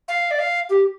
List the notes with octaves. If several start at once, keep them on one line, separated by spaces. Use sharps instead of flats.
F5
D5
F5
G4